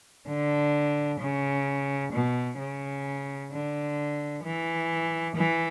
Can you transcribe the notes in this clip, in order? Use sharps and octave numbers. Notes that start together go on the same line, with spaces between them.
D3
C#3
B2
C#3
D3
E3
E3